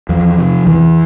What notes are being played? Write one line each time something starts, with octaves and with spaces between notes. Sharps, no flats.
E2 F3
C3
E2 E3